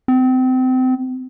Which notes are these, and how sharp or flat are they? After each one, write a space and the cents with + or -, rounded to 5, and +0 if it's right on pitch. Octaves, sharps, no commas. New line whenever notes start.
C4 -30